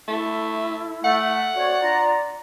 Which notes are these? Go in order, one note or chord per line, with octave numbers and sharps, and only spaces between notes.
A3 E4
A3 F#5
C4 F#4 C#5 D5
D4 F4 A#5